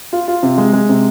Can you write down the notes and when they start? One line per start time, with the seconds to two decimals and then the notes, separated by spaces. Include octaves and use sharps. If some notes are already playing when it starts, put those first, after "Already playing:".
0.13 F4
0.28 F4
0.43 C3
0.58 G#3
0.73 G#3
0.89 C3